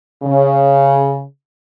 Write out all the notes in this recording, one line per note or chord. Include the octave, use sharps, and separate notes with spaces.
C#3